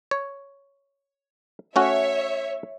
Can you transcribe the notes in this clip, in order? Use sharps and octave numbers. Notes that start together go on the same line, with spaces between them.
C#5
A3 C#4 F#4 C#5 E5